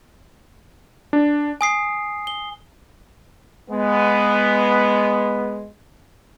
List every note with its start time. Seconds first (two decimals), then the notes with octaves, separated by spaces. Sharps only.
1.13 D4
1.61 G#5 D#6 C7
2.27 G7
3.70 G#3 B3